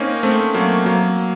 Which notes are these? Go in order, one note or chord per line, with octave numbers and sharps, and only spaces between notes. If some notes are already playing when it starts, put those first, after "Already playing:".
Already playing: A#3 C4 C#4 D#4
A3 C4
F#3 A#3
F#3 A#3